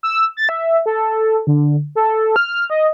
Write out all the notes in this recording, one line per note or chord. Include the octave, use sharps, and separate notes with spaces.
E6
A6
E5
A4
D3
A4
F6
D#5